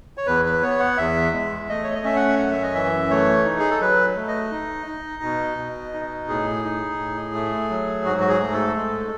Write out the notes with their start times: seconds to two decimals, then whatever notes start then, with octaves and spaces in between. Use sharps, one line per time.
0.17 C#5
0.27 E2 B4
0.45 B4
0.62 B3 C#5
0.80 F#5
0.97 E2 E5
1.33 G#3
1.69 A3 D#5
1.83 C#5
1.94 D#5
2.04 C#4 E5
2.16 F#5
2.39 F#2 F#5
2.51 E5
2.63 D#5
2.74 E3 E5
3.10 A3 C#5
3.45 D#4
3.59 G#4
3.70 A4
3.81 F#3 B4
4.16 A3
4.28 D#5
4.52 D#4
4.87 D#4
5.23 B2
5.58 B2
5.93 D#4
6.29 A2 G#4
6.64 D#4
6.99 A2
7.35 A3
7.70 F#3
8.05 G#2 F#4
8.20 F#4
8.29 G#4
8.40 A3
8.52 A4
8.76 G#3